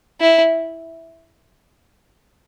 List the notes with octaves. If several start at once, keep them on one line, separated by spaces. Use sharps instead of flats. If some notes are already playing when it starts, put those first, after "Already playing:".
E4